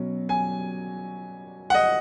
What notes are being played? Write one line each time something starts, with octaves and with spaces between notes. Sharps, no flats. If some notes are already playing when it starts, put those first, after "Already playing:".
Already playing: B2 F#3 C#4
G#5
F#5
D#5